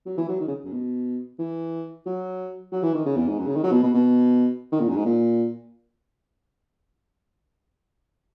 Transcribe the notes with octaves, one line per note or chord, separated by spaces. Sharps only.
F#3
E3
F#3
D#3
C#3
F#2
B2
E3
F#3
F#3
E3
D#3
C#3
E2
G#2
F#2
C#3
D#3
F#3
B2
B2
B2
D#3
A#2
F#2
G#2
A#2